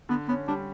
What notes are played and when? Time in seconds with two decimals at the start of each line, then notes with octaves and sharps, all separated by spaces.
0.09 D3 B3
0.28 B3 C#4
0.48 G3 D4